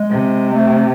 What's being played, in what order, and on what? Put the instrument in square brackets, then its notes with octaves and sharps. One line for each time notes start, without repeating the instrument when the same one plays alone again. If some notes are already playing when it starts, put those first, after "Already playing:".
Already playing: [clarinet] G#3
[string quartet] C3
[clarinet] A3